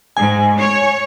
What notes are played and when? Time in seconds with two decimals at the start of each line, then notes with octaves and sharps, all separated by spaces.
0.17 G#2 G#5
0.59 C#5